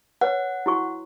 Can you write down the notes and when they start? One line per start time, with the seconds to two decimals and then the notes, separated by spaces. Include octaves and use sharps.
0.21 B4 C#5 F#5
0.66 E4 F#4 C#6